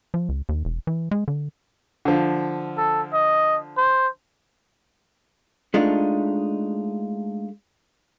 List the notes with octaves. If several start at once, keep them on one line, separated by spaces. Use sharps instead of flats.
F3
C#2
D#2
E1
E3
G#3
D3
D3 F3
A4
D#5
C5
G#3 A3 D4 D#4 F4